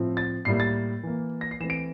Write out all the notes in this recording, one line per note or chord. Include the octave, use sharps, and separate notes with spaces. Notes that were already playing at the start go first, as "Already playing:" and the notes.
Already playing: A2 F3 C4
A6
A2 G3 A#3 C7
A6
E3 A#3
A#6
C7
E3 A3 C4 E7
D7